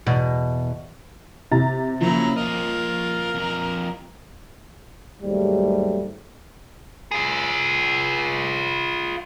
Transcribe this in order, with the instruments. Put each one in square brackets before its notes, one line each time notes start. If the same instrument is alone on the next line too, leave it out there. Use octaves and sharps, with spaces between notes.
[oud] E2 B2
[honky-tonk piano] C3 A#5 A6
[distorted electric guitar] C#3 [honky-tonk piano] F3 A#3 [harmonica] F#3 E4 A#5
[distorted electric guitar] F4 D#5 [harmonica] A#4
[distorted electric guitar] F2 A#5
[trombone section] D#2 G#2 F#3 G3 A3
[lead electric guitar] F4 G#4